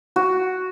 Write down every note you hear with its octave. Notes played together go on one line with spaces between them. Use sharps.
F#4